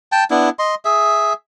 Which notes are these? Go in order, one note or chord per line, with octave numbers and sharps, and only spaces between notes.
G5 A5
B3 D4 E4
D#5 C6
G#4 E5